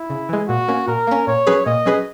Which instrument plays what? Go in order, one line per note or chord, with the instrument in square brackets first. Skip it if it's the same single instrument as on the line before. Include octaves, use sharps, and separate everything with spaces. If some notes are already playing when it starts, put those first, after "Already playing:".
Already playing: [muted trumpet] E4
[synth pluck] C#3
E3 G#3
[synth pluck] A#2 [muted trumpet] F#4
[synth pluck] A#3 C#4
[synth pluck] A#2 [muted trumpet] A#4
[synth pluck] A#3 C#4
[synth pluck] A#2 [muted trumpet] C#5
[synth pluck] F#3 C#4 G#4 B4
[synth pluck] A#2 [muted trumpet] D#5
[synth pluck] F#3 C#4 G#4 B4